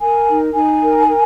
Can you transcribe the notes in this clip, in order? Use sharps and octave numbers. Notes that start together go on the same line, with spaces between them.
A#4 G#5
D#4
D#4 G#5
A#4
A#4